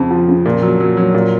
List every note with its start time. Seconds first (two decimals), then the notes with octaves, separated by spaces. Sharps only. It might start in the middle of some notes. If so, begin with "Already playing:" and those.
Already playing: F2 C#3
0.11 F3
0.28 C#3
0.45 A#2
0.63 F#3
0.80 F#3
0.97 F#3
1.14 A#2